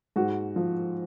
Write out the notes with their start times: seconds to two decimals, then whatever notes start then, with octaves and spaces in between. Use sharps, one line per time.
0.16 G#2 F#4
0.56 F3